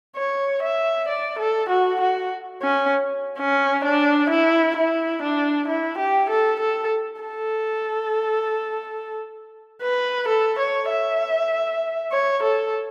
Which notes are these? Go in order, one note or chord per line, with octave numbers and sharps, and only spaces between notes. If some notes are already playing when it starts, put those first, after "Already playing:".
C#5
E5
D5
A4
F#4
F#4
C#4
C#4
D4
E4
E4
D4
E4
G4
A4
A4
A4
B4
A4
C#5
E5
C#5
A4